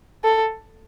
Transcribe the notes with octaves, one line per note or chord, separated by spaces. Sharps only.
A4